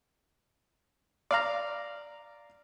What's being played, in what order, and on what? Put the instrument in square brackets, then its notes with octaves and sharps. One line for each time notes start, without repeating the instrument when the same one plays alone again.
[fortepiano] D5 F5 A#5